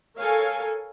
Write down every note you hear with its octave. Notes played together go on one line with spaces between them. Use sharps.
A4 A#4 C#5 F5 G#5